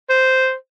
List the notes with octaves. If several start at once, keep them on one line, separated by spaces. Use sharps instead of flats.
C5